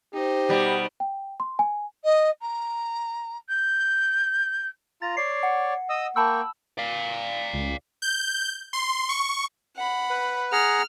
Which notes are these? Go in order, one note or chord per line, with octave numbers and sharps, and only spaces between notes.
D#4 G4 C5
B2 G3
G5
C6
G#5
D#5
A#5
G6
F4 A#5 A6
C#5 D5 C7
F#5
D#5 D#6 E6
A#3 G5 A5 B5 C#6 E6
D5 F5
C#2
G6
C6
C#6
F#5 B5
B4
G#4 F#5 A#5 F6